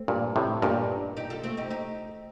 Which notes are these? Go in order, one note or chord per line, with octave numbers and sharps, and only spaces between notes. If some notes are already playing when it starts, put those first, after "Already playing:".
Already playing: A3 C4
G2 A#2
A2 C3
G2 A#2 D#4 G4
D#4 G4
F4 A4
A3 C4
D#4 G4
D#4 G4